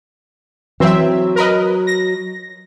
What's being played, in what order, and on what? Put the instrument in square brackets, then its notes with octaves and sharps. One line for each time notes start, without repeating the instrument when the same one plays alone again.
[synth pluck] E3 [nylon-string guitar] F#3 [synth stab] C4 E5
[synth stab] A#4 B4 D#5
A#6